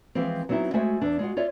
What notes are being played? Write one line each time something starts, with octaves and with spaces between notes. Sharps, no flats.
E3 F3 G#3 C4
F#3 B3 C4 D#4 E4
G#3 A3 F#4 C5 E5 G#5
E2 D4
G#3 F4 F#4
F4 C#5 D5 E5